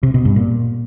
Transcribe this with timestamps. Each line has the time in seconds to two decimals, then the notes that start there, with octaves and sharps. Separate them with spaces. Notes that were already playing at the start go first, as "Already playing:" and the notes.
0.03 C3
0.14 B2
0.25 G2
0.36 A#2